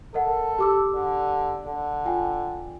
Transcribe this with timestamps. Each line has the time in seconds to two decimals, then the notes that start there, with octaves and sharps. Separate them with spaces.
0.14 A4 A#4 D#5 F#5
0.58 G4 D6 E6
0.94 D3
1.66 D3
2.05 F4 G5 G#5